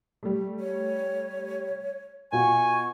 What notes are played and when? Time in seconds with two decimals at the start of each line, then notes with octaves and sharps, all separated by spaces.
0.23 G3 A3
0.60 C#5
2.33 B2 F4 F#4 G#5 C#6